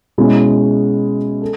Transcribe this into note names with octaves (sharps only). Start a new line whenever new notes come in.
B2 G#3 C#4 E4 G#4
A4